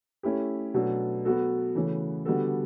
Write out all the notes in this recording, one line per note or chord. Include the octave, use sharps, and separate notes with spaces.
A3 C#4 E4 G4
B2 F#3 A3 D4 A4
F#3 B3 F#4 A4
C#3 E3 A3 C#4
D3 G3 B3 F#4 A4